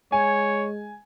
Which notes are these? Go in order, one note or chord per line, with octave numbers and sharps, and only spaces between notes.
G#3 C#5 G#5